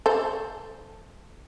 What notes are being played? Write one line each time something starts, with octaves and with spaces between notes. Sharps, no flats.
A4 C5